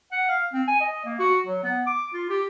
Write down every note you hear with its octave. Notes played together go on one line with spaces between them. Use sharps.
F#5
F5
C4
G#5
D#5
A#3
F#4
F#3
B3
D6
F4
G4